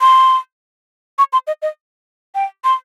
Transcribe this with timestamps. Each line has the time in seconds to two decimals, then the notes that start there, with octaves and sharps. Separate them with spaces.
0.01 C6
1.18 C#6
1.33 C6
1.47 D#5
1.62 D#5
2.35 G5
2.64 C6